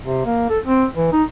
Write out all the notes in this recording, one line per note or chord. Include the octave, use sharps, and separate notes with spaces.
C3
A#3
A4
C4
E3
D#4